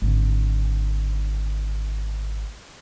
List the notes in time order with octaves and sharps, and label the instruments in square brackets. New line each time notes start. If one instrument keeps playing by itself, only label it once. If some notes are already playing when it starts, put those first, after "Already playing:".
[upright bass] G#1 D3